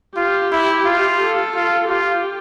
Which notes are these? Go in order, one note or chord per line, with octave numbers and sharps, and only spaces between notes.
F4 G4
E4
F4
A4
F4
F4 G4